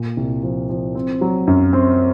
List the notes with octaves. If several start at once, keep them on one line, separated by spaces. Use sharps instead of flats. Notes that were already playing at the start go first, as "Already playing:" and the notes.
Already playing: A#2
C2
F3
F3
C4
F#3
F#2
C4